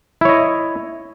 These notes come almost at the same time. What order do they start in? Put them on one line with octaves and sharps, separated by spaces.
E4 C#5 D#5